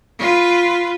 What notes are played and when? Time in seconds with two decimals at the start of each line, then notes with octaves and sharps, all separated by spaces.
0.19 F4 B4